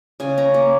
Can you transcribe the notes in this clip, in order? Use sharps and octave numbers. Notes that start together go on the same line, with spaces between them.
C#3 G#5
C#4 A#5
A#3